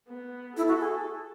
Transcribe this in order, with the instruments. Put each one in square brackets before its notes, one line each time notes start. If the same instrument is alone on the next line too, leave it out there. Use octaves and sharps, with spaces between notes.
[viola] B3
[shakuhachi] E4 [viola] A4
[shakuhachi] F#4
G#4